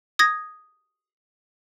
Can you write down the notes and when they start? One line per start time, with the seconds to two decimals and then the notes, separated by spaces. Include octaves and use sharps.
0.19 D#6 G#6 A#6